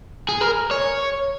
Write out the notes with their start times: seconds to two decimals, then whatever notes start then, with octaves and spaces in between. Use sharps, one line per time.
0.29 G#4
0.41 A#4
0.71 C#5